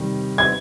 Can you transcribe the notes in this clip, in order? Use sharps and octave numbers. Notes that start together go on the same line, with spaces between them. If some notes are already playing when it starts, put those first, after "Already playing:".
Already playing: C3 D#3 G3
G#6